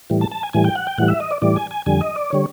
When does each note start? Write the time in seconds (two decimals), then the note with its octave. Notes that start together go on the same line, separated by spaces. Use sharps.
0.10 A2 E3 G3
0.21 A5
0.31 A5
0.43 G#5
0.53 A2 E3 G3 G#5
0.64 G5
0.75 F#5
0.87 G5
0.98 A2 E3 G3 F#5
1.08 E5
1.20 D#5
1.31 D5
1.42 A2 E3 G3 D5
1.56 G#5
1.71 G#5
1.86 F2 D3 G3 G#5
2.01 D#5
2.16 D5
2.30 D3 G3 C#5